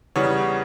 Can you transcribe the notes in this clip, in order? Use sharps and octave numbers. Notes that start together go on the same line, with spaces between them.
E2 C#3 E3 G3 B3 C#5